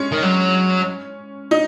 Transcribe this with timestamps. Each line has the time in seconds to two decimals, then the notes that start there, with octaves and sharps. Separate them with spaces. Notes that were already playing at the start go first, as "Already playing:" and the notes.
Already playing: G#3 C#4
0.12 D#3
0.23 F#3
1.51 D#4